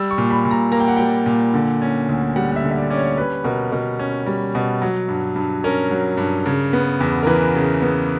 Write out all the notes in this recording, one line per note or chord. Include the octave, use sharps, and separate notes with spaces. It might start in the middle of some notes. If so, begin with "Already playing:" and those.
Already playing: G3 E6
C#6
A#2
B5
A#2
A#5
A#3 A#5
G5
F#5
G3 G5
A#2
D3
C#4
D2
G3 F#5
F#5
E5
D3
E5
D5
C#4 D5
C#5
G3 B4
B2 A#4
B2 A#4
C#4
G3
B2
F#3
G2
G2
C#4 A#4
F#3
G2
C#3
B3
E2
A#4
E3 B4
C#3
B3